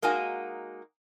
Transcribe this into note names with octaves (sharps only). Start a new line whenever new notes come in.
G#3 A#3 D#4 F#4 G#5